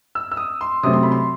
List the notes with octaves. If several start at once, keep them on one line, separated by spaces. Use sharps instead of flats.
E6
E6
D#6
C6
C3 F#3 A3 C4 D#6
C6
B5
C6